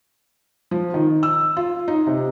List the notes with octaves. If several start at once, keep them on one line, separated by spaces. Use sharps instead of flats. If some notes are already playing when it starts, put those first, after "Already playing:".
F3
D#3
E6
F4
D#4
C3